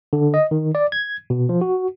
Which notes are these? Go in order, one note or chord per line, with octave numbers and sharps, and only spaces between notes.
D3
D#5
D#3
D5
G#6
B2
F3
F#4